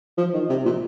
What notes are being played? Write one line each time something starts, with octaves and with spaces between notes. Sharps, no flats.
F3
D#3
C3
A#2